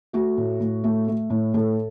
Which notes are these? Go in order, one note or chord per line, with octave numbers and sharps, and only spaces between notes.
A3 F#4
A2
A2
A3
A3
A2
A2 A4